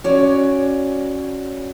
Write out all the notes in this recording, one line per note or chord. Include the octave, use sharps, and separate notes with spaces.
C#4 F#4 C#5 D5